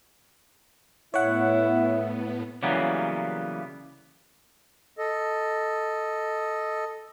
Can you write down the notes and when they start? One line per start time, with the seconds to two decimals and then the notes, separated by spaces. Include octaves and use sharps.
1.14 A2 B3 E4 C#5 F#5
2.63 C#3 E3 F#3 G3 A#3 B3
4.97 A4 D#5